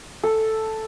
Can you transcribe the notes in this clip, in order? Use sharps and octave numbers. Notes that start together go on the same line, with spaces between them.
A4